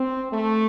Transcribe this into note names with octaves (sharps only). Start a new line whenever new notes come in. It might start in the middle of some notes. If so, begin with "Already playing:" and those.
Already playing: C4
A3